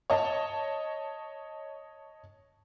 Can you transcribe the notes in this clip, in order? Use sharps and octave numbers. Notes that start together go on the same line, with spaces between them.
C#5 D#5 A5